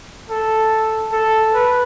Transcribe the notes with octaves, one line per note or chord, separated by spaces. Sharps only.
A4
A4
B4